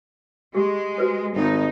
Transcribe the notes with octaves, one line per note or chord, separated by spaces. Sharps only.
G#3 G4 G#4
F#4 B4 C5
G#1 D#4